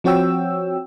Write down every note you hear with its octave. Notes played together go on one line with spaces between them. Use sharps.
F3 C4 F#4 C#5 G5 E6